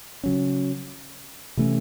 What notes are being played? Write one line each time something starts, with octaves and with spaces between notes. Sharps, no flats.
C#3 F#3 C#4
C3 E3 A3 C#4